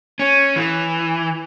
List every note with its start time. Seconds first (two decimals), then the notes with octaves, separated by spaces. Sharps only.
0.19 C#4
0.56 E3